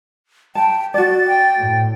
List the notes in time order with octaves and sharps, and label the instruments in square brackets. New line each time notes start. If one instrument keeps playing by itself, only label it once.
[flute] G5 [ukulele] A5
[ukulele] F#4 D5 [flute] A6
[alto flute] G5
[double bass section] A2